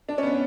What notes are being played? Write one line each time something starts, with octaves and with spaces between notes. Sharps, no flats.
D4
C#4
B3